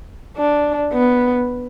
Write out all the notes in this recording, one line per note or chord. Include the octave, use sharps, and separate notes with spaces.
D4
B3